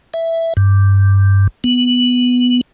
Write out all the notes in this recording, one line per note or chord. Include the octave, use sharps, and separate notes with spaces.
E5
G2
B3